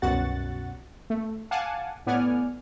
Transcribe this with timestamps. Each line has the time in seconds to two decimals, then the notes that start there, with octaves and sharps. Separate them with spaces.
0.02 C2 F#2 B2 F#4 F#5 A6
1.10 A3
1.51 F5 F#5 G#5 A5 D6
2.06 A2 B3 D5 F#5 G#5 F6